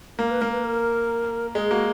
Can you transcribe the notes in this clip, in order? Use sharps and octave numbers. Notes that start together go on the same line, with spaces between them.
A#3 A#4
B4
A#3 A#4
B4
A#4
G#3 G#4
A#3 F#4